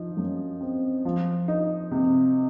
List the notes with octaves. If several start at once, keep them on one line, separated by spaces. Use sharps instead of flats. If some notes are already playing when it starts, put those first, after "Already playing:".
Already playing: F3 D#4
F#2
C4
F3
D#4
C3